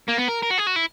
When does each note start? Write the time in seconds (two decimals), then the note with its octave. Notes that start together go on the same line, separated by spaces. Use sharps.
0.09 A#3
0.18 B3
0.29 A#4
0.43 A#4
0.51 F#4
0.58 G#4
0.67 F#4
0.76 E4